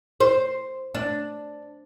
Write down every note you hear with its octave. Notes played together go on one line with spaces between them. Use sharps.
C5
D4